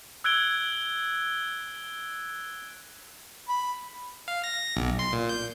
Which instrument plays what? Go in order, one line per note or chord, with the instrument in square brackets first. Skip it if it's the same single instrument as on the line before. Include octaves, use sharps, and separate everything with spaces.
[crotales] E6 F#6 G#6 D7 G7
[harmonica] B5
[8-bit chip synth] F5
A#6
B1
C6
A#2
G6